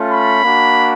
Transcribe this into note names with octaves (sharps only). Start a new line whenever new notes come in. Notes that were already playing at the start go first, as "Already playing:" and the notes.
Already playing: A3 C#4 F4
B5
A#3 D4 F#4